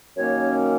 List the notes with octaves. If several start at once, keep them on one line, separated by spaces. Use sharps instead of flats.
F#2 D#3 A#3 C#4 C#5